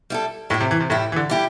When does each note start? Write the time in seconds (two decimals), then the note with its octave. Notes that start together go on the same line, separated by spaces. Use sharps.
0.10 G3 E4 A4
0.50 A2 G3 E4 G4
0.61 C3
0.71 E3
0.80 C3
0.90 A2 G3 E4 G4
1.12 E3
1.16 D3
1.30 G3 E4 G4